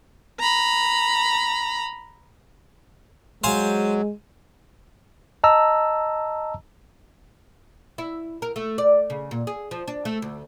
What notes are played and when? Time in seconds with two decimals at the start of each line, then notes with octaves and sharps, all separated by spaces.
0.40 A#5 B5
3.44 F#3 G#3 C5 F5 G#5
5.44 D#5 A5 A#5 E6
7.98 E4
8.42 A#4
8.56 A3
8.78 D5
9.10 C#3
9.31 A#2
9.47 G#4
9.71 F3
9.88 D4
10.05 A3
10.22 D2